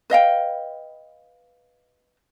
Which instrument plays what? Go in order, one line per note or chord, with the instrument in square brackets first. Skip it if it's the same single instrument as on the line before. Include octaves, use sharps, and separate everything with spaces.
[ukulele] B4 D#5 F5 G5